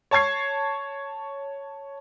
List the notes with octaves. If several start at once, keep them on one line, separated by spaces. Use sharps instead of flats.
C#5 A5 C#6 G#6 C7